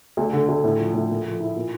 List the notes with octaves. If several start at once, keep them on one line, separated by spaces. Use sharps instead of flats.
D2
D3
D2
A2
F3
A2
A#2
F3
E4
A#2